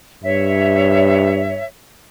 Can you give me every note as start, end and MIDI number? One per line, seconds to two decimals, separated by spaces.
0.24 1.64 43
0.24 1.65 73
0.24 1.65 76